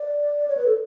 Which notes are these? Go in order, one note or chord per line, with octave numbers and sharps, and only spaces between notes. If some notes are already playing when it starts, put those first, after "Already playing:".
Already playing: D5
C#5
B4
A4